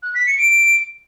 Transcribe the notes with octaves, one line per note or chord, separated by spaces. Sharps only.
F#6
B6
C#7
D7